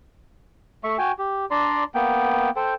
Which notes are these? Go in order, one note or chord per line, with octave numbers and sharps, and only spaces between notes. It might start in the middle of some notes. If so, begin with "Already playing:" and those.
A3 E5 C#6
F#4 G5 G#5
G4
D4 D5 A#5 C6
A#3 B3 G5
A4 C5 G5